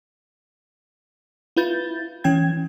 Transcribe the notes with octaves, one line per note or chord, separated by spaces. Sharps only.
E4 F4 B4 G6 A6
E3 C#4 G5 G#6